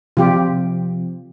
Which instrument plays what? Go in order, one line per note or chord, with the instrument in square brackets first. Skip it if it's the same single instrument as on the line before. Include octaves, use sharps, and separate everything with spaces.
[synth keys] C3 F3 [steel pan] F4 G4